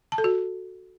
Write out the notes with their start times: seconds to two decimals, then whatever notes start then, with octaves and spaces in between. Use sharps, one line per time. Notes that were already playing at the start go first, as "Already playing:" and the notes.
0.12 A5
0.18 A4
0.24 F#4